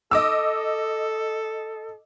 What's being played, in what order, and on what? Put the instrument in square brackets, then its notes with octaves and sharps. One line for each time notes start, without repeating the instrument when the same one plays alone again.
[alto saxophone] A4 [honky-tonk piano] D#5 D6 E6